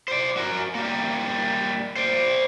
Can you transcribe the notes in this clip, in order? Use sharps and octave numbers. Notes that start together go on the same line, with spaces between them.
C5 D5
F#4 A#4
G3 A#3
C5 D5